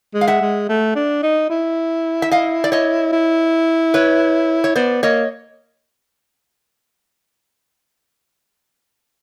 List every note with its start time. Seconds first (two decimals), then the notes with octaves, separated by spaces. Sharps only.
0.14 G#3
0.21 F5
0.28 E5 F#5
0.42 G#3
0.69 A3
0.96 D4
1.23 D#4
1.50 E4
2.22 E5
2.31 D#5 F5
2.64 D5
2.72 C#5 D#5
3.13 E4
3.94 B4 C#5
4.64 C#5
4.76 B3 C5 D5
5.03 A#3 C#5 D#5